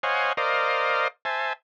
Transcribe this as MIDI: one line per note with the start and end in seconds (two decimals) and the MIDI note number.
0.03 0.33 72
0.03 0.33 73
0.03 0.33 75
0.03 0.33 77
0.03 0.33 78
0.03 0.33 80
0.37 1.08 70
0.37 1.08 72
0.37 1.08 74
0.37 1.08 75
0.37 1.08 77
1.25 1.53 72
1.25 1.53 76
1.25 1.53 80
1.25 1.53 81